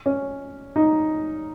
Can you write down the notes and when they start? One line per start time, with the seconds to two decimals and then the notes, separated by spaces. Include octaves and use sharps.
0.06 C#4
0.76 D#4